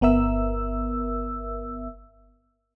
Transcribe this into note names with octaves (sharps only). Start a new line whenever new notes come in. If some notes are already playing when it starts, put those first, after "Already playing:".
G1 B3 A#4 E5 E6